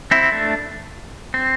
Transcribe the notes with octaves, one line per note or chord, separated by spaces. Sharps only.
C4 E4
A3 D4
C4